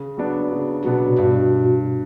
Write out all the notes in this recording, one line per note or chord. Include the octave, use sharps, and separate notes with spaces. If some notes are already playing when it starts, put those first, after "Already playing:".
Already playing: C#3
F#3 B3 D4
C#3
B2 F#3 B3 D4
G2 B2